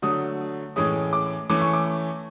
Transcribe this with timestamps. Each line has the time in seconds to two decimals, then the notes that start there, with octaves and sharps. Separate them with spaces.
0.02 D3 F#3 A3 D#6
0.76 A2 E3 G#3 C#4 D#6
1.13 D6
1.49 E3 A3 C#4 D6
1.61 C#6
1.73 D6